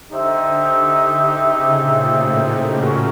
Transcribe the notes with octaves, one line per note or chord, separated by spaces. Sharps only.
D3 D#4 G4 C5 E5
C#3
A#2
A2
C#4 F#4 A#4